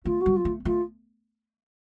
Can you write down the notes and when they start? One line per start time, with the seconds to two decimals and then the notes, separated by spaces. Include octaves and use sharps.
0.05 A3 F4
0.21 F#4
0.26 G3
0.36 F4
0.45 A3
0.65 A3 F4